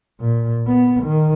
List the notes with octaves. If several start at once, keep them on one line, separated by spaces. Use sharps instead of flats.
A#2
B3
D#3